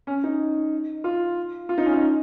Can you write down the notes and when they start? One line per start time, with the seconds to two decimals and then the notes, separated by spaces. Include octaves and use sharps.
0.07 C#4
0.24 D#4
1.04 F4
1.69 F4
1.78 D#4
1.86 C#4
1.94 D#4